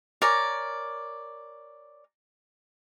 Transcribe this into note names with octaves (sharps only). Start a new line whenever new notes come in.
A#4 C#5 D5 G#5